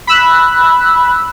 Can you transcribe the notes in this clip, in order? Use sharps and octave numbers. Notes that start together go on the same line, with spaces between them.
B5 E6 F#6